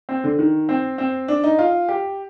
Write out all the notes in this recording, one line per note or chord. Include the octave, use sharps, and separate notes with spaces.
C4
D3
D#3
C4
C4
D4
D#4
F4
G4